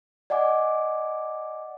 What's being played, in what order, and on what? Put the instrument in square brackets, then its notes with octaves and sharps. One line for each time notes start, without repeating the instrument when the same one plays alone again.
[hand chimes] D5 D#5 F#5 G#5 D6